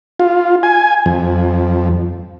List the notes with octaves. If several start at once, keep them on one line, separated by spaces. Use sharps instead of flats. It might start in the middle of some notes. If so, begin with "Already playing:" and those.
F4
G#5
F2